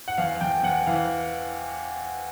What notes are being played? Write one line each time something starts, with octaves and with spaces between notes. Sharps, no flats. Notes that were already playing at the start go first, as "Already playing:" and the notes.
F#5
E2 F5
E2 G5
E2 F#5
E3 F5